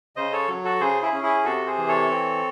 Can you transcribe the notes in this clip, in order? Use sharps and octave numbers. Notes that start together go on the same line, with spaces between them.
C#3 C5 D#5
A4 C#5
F#3
F#4 A4
C#3 G#4 C5
E4 G#4
C#4
E4 G#4
C3 F#4 A4
G#4 C5
E3
A4 C#5
C4